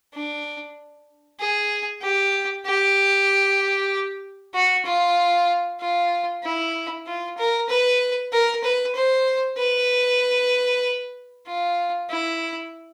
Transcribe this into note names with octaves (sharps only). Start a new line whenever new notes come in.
D4
G#4
G4
G4
F#4
F4
F4
E4
F4
A#4
B4
A#4
B4
C5
B4
F4
E4